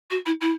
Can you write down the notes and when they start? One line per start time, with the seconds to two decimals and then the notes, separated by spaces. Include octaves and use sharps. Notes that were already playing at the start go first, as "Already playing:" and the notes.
0.10 F#4
0.26 E4
0.41 E4